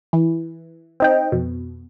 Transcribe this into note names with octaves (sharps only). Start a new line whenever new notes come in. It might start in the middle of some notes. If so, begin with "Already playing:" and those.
E3
C4 D#4 G5
F2 B2